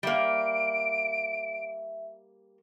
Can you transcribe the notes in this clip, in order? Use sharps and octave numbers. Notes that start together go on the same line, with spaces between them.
G3 A#3 E5 D7